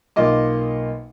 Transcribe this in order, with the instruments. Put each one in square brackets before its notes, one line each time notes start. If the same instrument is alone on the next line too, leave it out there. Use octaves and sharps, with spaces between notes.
[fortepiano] B1 A#3 F4 D#5 D6